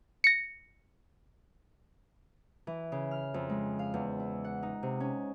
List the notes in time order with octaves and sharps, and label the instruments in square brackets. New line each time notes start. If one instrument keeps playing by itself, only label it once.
[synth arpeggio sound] A#6 C#7
[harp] E3
C#3
F6
F2
G#3
F5
E2
E4
F#5
D#4
C3
C#4